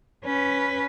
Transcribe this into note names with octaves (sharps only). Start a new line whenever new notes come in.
C#4 B4